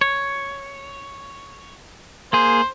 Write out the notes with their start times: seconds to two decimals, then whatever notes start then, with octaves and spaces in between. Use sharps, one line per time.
0.01 C#5
2.33 A#3 G#4 C5